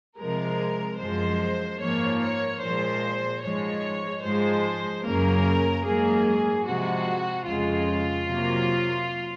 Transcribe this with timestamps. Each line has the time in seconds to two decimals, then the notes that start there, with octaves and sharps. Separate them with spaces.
0.18 C3 F3 G#3 A#4
0.99 F#2 F3 G#3 C5
1.79 G#2 F3 A#3 C#5
2.21 C#5
2.61 A#2 F3 G#3 C5
3.42 G#2 F3 G#3 C#5
4.23 G#2 F3 G#3 C5
5.03 F#2 C#3 F#3 A#3 A#4
5.84 G#2 F#3 A#3 G#4
6.65 C3 F3 G#3 F#4
7.46 F2 C#3 G#3 F4
8.27 C3 F#3 A#3